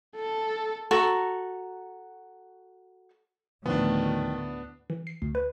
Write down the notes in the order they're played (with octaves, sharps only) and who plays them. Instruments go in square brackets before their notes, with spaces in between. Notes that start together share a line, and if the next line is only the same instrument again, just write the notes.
[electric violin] A4
[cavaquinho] F#4 A4 A#5 C#6
[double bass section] D2 A2 [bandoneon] D#3 [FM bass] F3 [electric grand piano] B3 D4
[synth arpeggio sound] E3
C7
D2
B4